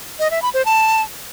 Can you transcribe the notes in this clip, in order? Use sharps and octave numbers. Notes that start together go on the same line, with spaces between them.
D#5
E5
B5
C5
A5